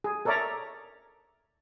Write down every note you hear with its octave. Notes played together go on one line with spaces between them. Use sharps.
G#4
A4 A#4 C#5 D5 E5 A#5